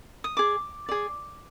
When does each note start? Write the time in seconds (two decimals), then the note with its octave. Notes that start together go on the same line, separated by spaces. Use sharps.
0.24 D#6
0.37 G#4 D5 D6
0.89 G#4 D5